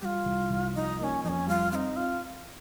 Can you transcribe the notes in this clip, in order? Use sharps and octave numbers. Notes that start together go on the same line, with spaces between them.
G3 F4 G4
C2
C2
F3 D#4
A#3 C#4 D#4
F2 C#4 D#4
G3 F4
C4 D#4 F4
F4